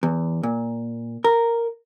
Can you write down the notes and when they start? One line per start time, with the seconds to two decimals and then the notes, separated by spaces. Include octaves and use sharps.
0.03 E2
0.43 A#2
1.24 A#4